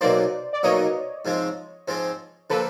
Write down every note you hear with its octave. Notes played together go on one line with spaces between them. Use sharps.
B1 B2 F#3 A#3 D#4 C5 D5
D5
B1 B2 F#3 A#3 D#4 C#5 D#5
G#2 F3 G#3 C4
G#2 F3 G#3 C4
D3 F3 A#3 A4 B4